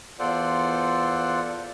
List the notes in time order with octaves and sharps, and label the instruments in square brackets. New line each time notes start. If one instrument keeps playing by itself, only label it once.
[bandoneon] E2 F4 A4 C5 D5 F#5